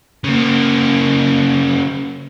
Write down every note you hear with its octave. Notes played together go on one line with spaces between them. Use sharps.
C#3 A#3